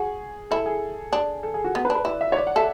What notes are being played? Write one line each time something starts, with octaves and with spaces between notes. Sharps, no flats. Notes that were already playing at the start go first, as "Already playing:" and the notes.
Already playing: F#4 G#4
E4 A4
G#4
D4
A4
G#4
F#4
B3
B4
D4
B4
E4 D5
E5
C#5
D5
F#5
A4 E5